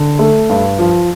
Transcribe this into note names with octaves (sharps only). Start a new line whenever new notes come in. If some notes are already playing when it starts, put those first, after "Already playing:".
Already playing: D3
A3
G2
F3